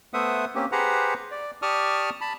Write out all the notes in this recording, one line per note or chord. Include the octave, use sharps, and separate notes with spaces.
A3 B3 C5 E5 F#5 D#6
A#3 C4 C#4 G4
G4 G#4 B4 C5 F#5 A#5
D5
G4 D5 A5 C#6 D#6 F6
A5 B5